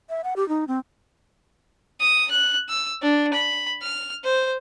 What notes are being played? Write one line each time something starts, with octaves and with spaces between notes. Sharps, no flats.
E5
F#5
G4
D#4
C4
D#6
F#6
E6
D4
B5
F6
C5